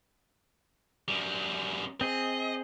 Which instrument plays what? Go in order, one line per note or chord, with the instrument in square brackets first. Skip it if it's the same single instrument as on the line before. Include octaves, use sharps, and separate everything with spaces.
[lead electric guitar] F#2 G3
[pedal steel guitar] C4 G#4 [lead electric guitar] D#5